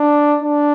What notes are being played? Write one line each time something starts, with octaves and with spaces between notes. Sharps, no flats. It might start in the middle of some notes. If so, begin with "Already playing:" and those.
Already playing: D4
D4